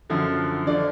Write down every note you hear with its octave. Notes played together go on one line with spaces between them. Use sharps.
F#2 D3 F3
D3 F3 D5